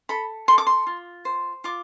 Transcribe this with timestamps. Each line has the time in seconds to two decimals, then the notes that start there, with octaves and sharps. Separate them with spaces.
0.09 A4 B5
0.48 A4 C6
0.58 D6
0.67 C6
0.87 F4
1.25 C5
1.64 F4 D6